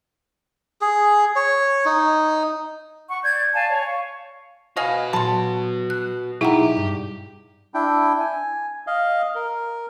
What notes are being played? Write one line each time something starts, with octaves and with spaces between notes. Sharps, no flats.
G#4
C#5
D#4
F#5 C#6
D5 G6 G#6
D5 F5 G#5 A5
C#5
F5 C#6
F#4 B4 D#5 F5 G#5
A#2 F#3 A5 C6
F#6
B1 D#4 E4 G4 G#4 F#5 G5 A#5
G2
D4 E4 G5
G#5
D#5 F5
A#4